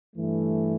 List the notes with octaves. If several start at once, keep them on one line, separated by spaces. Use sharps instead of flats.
G2 E3 A3